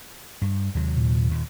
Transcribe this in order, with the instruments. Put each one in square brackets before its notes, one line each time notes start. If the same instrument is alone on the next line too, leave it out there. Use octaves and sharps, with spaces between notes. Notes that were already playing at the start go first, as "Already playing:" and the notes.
[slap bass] G2
D#2 C3 F#3
[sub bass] A#2
[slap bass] D#2 A#2